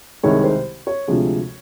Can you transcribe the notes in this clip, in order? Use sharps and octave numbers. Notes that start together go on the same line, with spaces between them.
C2 C3 D#3 G#3 C#5
C5
C#5
D2 C3 F3 G#3